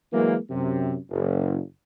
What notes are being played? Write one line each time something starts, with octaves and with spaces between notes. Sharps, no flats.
E3 F#3 G#3 A#3
F#2 C3
F#1